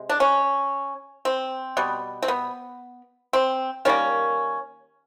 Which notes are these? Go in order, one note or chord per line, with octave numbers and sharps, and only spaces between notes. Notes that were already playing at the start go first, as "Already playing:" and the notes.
Already playing: C3 G#3
D4
C#4
C4
B2 G3 B3
C4
B3
C4
D#3 G3 A#3 C#4